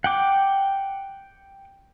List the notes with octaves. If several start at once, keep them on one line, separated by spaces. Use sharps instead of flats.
F#5 G5 D6